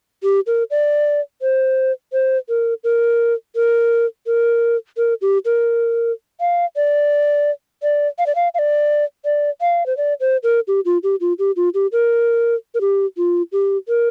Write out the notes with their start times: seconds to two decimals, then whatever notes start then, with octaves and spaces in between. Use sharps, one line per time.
0.23 G4
0.47 A#4
0.71 D5
1.42 C5
2.13 C5
2.49 A#4
2.84 A#4
3.56 A#4
4.27 A#4
4.97 A#4
5.21 G4
5.45 A#4
6.40 F5
6.76 D5
7.83 D5
8.19 F5
8.27 D5
8.35 F5
8.54 F5
8.59 D5
9.25 D5
9.61 F5
9.86 C5
9.97 D5
10.20 C5
10.43 A#4
10.68 G4
10.85 F4
11.03 G4
11.21 F4
11.39 G4
11.56 F4
11.74 G4
11.92 A#4
12.75 A#4
12.81 G4
13.17 F4
13.52 G4
13.88 A#4